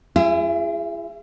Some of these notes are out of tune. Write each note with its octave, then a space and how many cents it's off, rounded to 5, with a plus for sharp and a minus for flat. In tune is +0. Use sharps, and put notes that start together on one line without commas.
E4 +45 G#4 -20 E5 +0